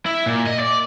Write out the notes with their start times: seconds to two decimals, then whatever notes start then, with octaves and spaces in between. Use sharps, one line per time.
0.06 E4
0.26 A#2
0.47 D#5
0.59 D5